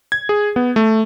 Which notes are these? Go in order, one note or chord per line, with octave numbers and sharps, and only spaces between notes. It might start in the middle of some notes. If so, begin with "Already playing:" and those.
G#6
G#4
B3
A3